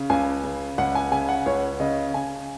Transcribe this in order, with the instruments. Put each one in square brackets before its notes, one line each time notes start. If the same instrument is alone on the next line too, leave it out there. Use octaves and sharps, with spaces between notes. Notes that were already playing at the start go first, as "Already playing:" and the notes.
Already playing: [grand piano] C#3
C#2 G#5
C#3
C#2 F#5
G#5
C#3 G#5
F#5
C#2 C#5
C#3 D#5
C#3 G#5